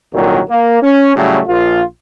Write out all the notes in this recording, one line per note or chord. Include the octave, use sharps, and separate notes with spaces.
C2 A#2 D3 D#3 F#3
A#3
C#4
A2 C#3 F#3 G3 A3
A#1 F4